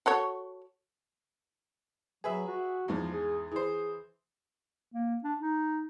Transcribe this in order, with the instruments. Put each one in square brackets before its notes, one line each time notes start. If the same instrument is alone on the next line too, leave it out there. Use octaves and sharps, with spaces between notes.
[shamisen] F#4 A4 C#5
[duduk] F#3 [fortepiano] G#4 B4 E5
[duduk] F#4
[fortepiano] E2 G#2 [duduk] F3
[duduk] G#4
[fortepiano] E3 C5 [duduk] G#4
[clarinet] A#3
D4
D#4